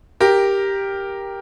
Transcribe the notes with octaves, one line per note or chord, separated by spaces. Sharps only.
G4 A#4